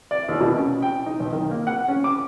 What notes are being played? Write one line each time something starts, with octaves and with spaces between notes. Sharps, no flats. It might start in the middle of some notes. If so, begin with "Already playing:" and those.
D5
D#2
B2
C#4
G5
D#4
B1
D#3
A#3
F#5
C#4
D6